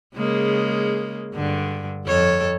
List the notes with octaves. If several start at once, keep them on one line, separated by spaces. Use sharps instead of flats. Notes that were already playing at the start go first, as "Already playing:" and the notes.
C#3 G#3 A#3
G2 D3
F2 A4 C#5